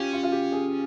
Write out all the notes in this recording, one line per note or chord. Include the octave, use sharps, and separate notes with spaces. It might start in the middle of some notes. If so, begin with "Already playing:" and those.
Already playing: C#4 F4 G4
F4
F4
G4
G#4